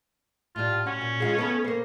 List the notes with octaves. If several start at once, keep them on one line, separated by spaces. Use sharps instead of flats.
A2 G3 F4
C#4 F#4
A#2
G#3 F4 G#4
A3 B3 A4
A#3 C5